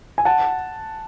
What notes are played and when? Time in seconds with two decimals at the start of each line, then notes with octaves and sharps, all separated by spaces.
0.18 G#5
0.25 F#5 A5